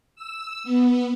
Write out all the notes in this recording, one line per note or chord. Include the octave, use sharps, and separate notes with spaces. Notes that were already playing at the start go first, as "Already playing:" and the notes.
E6
B3